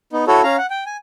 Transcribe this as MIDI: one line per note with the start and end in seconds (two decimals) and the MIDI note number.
0.13 0.25 59
0.13 0.25 63
0.28 0.42 64
0.28 0.42 66
0.28 0.42 69
0.28 0.42 73
0.43 0.56 61
0.43 0.56 77
0.43 0.56 82
0.58 0.66 78
0.70 0.84 79
0.86 0.97 80